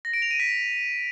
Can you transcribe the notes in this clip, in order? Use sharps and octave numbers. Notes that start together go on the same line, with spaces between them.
A#6
D7
F7
D#7
B6